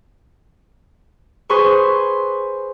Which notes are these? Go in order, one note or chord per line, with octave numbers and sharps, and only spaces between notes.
G#4 B4 C5 C6 C#6